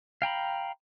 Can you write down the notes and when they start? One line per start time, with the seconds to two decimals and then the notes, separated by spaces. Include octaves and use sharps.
0.22 F5 G5 A#5 B5